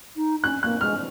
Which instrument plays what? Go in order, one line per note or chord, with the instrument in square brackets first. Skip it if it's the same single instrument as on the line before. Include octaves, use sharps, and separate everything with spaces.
[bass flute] D#4
[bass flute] C#4 [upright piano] F#6
[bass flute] A#3 [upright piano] F#6
[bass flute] G#3 [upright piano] F6